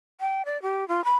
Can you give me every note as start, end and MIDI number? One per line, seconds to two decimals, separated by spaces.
0.21 0.45 79
0.45 0.60 74
0.62 0.87 67
0.88 1.04 65
1.04 1.17 83